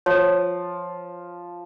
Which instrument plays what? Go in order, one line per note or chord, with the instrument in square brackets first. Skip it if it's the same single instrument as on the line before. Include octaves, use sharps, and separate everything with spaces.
[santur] F3 [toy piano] C#5